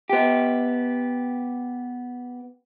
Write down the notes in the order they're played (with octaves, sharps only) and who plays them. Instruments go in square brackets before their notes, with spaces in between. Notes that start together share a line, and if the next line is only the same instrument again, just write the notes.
[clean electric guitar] B3 G4